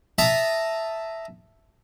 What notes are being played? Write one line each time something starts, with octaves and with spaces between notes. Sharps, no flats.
E5 A5 A#5 D#6